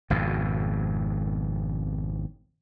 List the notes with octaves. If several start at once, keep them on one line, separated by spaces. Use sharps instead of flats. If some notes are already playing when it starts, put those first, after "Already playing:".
G#1 F2 B2